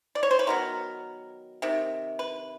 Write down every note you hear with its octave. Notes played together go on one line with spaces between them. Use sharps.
D5
C#5
C5
B4
D#3 F#3 B3 A#4
C3 D#3
B4